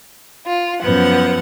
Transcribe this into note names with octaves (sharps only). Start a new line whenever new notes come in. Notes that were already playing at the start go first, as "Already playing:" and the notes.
F4
F#2 F3 B3 F#5